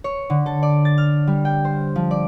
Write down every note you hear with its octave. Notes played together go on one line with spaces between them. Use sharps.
C#5
D3
A4
D5
A6
F6
G3
G5
C5
F3
D5